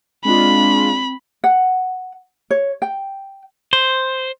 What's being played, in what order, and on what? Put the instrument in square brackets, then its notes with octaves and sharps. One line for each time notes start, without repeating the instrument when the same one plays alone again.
[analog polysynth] G#3 D4 F4 [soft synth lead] C4 [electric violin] B5
[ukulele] F#5
C#5
G5
[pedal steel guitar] C5